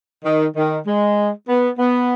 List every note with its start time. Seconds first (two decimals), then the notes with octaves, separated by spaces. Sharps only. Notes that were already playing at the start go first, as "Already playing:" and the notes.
0.25 D#3
0.56 D#3
0.87 G#3
1.48 B3
1.79 B3